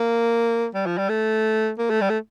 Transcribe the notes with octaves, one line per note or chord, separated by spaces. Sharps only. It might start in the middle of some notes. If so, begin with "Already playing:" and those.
Already playing: A#3
G3
F3
G3
A3
A#3
A3
G3
A3